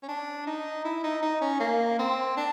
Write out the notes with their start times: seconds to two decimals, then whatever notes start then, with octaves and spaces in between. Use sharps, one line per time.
0.03 C#4
0.08 D4
0.47 D#4
0.84 E4
1.04 D#4
1.22 D#4
1.41 C#4
1.60 A#3
1.99 C4
2.37 D4